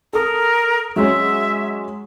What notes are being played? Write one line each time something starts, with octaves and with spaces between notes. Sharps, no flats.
A4 A#4 D#6
F#3 G#3 C#4 E5